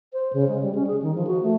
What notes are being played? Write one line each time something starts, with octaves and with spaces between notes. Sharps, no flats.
C5
C#3
G#3
G3
C#4
G#4
D#3
F3
F#4
A3